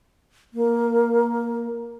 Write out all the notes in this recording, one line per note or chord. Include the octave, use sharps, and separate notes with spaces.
A#3